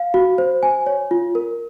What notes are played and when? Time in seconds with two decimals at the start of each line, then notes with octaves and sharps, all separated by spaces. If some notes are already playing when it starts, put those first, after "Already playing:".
Already playing: F5
0.14 F#4
0.38 C5
0.63 G#5
0.86 C#5
1.11 F4
1.35 A#4